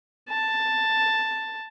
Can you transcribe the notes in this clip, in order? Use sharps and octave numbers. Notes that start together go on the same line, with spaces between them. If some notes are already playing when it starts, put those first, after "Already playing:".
A5